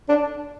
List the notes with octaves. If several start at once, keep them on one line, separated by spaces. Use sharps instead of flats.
D4